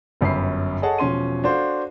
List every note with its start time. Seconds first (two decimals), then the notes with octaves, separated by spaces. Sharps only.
0.21 G1 F#2 B5 C7
0.82 G#4 A4 C#5 D#5 F#5 A5
0.98 E1 F3 C#4 C6 D#7
1.44 D4 F#4 A4 C5 F5